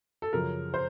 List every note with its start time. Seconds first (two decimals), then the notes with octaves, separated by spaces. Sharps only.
0.22 A4
0.33 F#2 C#3 F3 A#4
0.74 C5